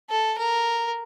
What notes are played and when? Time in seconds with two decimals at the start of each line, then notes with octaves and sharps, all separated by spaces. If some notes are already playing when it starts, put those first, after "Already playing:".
0.10 A4
0.38 A#4